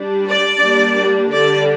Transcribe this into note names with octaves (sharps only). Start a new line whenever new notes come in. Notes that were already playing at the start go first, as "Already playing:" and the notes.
Already playing: G3 D4
D5
G3 A#3 D4
D3 G3 D4 D5